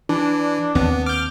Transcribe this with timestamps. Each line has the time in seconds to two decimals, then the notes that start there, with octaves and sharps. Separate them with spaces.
0.09 E3 D4
0.75 D#2 B3 C4
1.06 D6 F6 G6